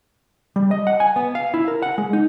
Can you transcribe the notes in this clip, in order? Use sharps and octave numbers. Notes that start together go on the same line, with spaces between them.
G3
D#5
F#5
G#5
B3
F5
E4
A#4
F#5
G#3
D#4